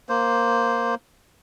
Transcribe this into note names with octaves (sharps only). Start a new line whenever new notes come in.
A#3 C5